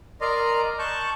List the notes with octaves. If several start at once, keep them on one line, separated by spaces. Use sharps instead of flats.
A#4 D5 D#5 A#5 C6
A5 C#6 F#6 G6